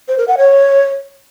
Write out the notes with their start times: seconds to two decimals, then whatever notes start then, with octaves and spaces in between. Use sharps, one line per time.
0.08 C5
0.18 A#4
0.28 F#5
0.38 C#5